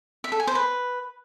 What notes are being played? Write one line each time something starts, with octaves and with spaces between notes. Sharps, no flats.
E5
A4
G#5
C5
B4